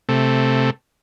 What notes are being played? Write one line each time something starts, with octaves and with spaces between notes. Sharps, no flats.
C3 A3